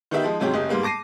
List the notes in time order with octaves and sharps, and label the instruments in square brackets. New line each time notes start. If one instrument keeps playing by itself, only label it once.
[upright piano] D#3 B3 D#4 G4 E5
F3 G#3 D#4
G#2 C3 F#3 G#3 C#4 G4
F#1 C#3 G4 D#5
G#2 G3 A#3 B3
A5 D6 A#6 C7 D#7